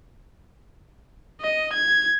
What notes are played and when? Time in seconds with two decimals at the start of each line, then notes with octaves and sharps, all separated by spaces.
1.41 D#5
1.73 G#6